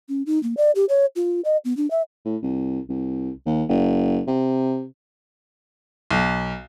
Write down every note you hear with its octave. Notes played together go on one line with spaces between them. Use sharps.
C#4
D#4
A#3
D5
G4
C#5
F4
D#5
B3
D4
E5
A2
C2
C2
D#2
F#1
C3
B1